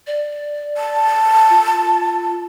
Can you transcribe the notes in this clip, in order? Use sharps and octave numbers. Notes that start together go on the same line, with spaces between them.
D5
A5
F4